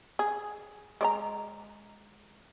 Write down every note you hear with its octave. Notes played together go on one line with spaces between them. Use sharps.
G#4
G#3 D5 A#5